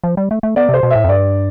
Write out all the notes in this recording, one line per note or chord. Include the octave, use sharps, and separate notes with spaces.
F3
G3
A3
A3
B3 D5
C3 C5
B2
A2 E5
F2
G2 D5